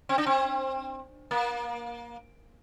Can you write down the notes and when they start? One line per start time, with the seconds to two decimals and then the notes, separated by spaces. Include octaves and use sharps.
0.09 C4
0.18 D4
0.26 C4
1.31 A#3